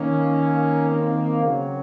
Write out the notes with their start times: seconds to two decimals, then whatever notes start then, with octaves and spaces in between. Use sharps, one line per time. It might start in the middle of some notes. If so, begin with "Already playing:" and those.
Already playing: D#3 A#3 C#4
0.89 C4
1.42 C#3 F#3 C4